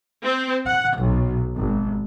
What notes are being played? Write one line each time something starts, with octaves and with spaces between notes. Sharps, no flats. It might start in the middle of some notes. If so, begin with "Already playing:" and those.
C4
F#5
B1
G#1